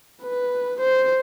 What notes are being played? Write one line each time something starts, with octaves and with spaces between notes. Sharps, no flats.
B4
C5